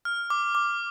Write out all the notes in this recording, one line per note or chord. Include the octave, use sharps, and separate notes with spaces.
F6
D6
D6